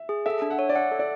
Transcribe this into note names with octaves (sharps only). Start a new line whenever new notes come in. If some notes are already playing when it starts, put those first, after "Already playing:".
Already playing: E5
G#4
A4 E5
D4
F#5
C#5
D5
E5 F#5
A4
D5